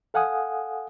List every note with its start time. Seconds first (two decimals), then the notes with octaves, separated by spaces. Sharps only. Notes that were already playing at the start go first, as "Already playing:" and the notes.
0.14 A4 F5 F#5 G#5 D#6